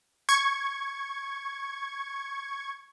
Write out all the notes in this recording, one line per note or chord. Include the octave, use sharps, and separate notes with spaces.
C#6 G#6